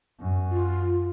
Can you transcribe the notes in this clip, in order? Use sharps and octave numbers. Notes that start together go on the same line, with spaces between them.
F#2
F4